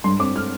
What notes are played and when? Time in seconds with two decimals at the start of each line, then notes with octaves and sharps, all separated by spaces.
0.04 G2 C6
0.19 C4 D6
0.36 F6